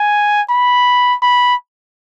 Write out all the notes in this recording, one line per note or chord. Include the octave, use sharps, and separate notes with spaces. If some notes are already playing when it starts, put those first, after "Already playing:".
Already playing: G#5
B5
B5